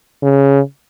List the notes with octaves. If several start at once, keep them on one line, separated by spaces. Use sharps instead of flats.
C#3